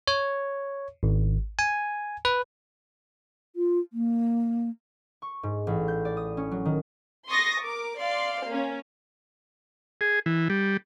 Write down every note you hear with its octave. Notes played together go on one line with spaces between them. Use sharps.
C#5
G#1
G#5
B4
F4
A#3
C#6
G#2
A1
G6
D5
D#6
C#4
F#3
D#3
C6 C#6 D#6 A6 A#6
A#4 D6
D5 F5 C6
A#3 C#4
G#4
E3
G3